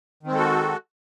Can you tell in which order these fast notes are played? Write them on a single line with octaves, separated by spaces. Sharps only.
D#3 C4 G#3 A4 F#4